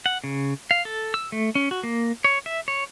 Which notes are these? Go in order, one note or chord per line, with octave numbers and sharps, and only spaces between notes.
F#5
C#3
F5
A4
E6
A3
C#4
F#4
A#3
C#5
E5
C#5